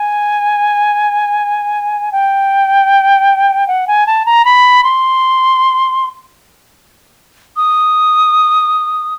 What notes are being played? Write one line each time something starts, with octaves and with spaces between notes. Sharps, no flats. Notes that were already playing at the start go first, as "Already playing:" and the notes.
Already playing: G#5
G5
F#5
G#5
A5
A#5
B5
C6
D#6